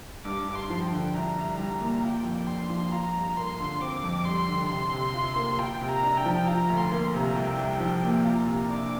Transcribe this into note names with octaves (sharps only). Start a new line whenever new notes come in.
G2 D6
G2
C6
F3
G5
D3
C2 A#5
C2
G3 A#5
A#2
F4 G5
F2
D4 C6
F3
F4 A#5
G2
A#3 C6
D3
C4 D6
F2
G3 C6
D3
C3 C6
C3
F4
A#3
F4 G5
C3
A#5
D4
G5
F3
F4 A#5
D2
C6
A#3
A#5
C3
C2 G5
C2
F3
A#2
F4 A#5
C3
D4 D6